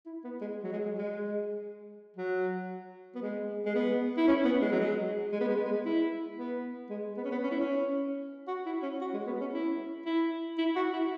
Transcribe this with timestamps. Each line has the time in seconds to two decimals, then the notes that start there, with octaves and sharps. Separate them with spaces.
0.06 E4
0.24 B3
0.41 G#3
0.63 F#3
0.72 G#3
0.85 G#3
0.98 G#3
2.17 F#3
3.15 B3
3.22 G#3
3.66 G#3
3.75 B3
4.17 E4
4.27 C#4
4.45 B3
4.62 G#3
4.72 F#3
4.80 G#3
5.32 G#3
5.40 B3
5.48 G#3
5.56 B3
5.65 G#3
5.85 E4
6.37 B3
6.90 G#3
7.17 B3
7.24 C#4
7.31 B3
7.43 C#4
7.51 E4
7.60 C#4
8.48 F#4
8.66 E4
8.82 C#4
9.01 F#4
9.14 G#3
9.26 B3
9.40 C#4
9.53 E4
10.06 E4
10.58 E4
10.76 F#4
10.93 E4